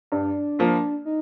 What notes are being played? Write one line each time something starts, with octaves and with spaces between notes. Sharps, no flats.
G2 D4
F3 A#3 F4
D#4